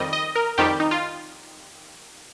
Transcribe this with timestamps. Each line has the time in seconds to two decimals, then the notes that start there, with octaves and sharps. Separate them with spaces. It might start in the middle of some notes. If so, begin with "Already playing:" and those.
Already playing: F2 D#3 G3 D#5
0.13 D#5
0.35 A#4
0.58 F2 D#3 G3 G4
0.80 D#4
0.91 F4